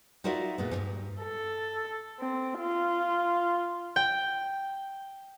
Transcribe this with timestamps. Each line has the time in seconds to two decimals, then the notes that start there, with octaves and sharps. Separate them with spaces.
0.24 D#4 F4 F#4 A#4 D5 E5
0.58 A#2 G#3 B3
0.71 E2 G2
1.23 A4
2.20 C4
2.60 F4
3.96 G5